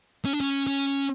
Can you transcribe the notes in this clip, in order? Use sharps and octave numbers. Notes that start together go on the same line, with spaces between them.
C#4
D4
C#4
C#4